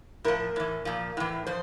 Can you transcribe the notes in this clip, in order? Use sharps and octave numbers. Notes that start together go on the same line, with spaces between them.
A2 F3 A#4
A2 E3
A#2 F3
A2 E3
F3 C5